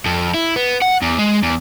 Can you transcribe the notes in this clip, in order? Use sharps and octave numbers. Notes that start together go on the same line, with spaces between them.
F2
E4
B3
F#5
E2
G#3
E2